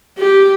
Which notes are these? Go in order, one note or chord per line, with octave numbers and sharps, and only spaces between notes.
G4